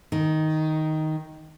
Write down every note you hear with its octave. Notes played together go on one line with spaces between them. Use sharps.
D#3